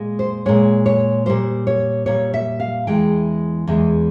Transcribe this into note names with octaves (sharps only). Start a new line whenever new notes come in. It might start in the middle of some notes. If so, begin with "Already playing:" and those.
Already playing: A#2 G#3
C5
A#2 G#3 C#5
C#5
A#2 G3 C5
C#5
A#2 G3 C#5
E5
F5
E2 E3 G#3 G5
E2 E3 G#3